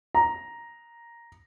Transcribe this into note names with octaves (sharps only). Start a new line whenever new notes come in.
A#5